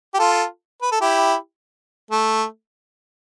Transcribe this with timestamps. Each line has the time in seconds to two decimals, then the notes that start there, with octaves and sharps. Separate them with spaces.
0.14 G4
0.19 F4 A4
0.82 B4
0.92 A4
1.01 E4 G4
2.11 A3